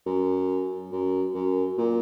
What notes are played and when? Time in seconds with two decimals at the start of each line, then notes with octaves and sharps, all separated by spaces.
0.06 F#2
0.92 F#2
1.34 F#2
1.78 A#2